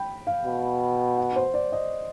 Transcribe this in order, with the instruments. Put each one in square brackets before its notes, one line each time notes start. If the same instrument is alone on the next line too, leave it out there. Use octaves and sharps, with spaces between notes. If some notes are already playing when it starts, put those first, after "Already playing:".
Already playing: [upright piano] G5 B5
F5
[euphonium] B2
[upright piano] F#5
C5
D5
D#5